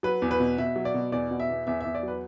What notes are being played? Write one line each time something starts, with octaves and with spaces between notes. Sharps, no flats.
F#3 B4
E2
B4
B2
B2 E5
F#3
D5
B2
E2 D5
B2
E5
E2
E2 E5
E2 E5
D5
F#3 B4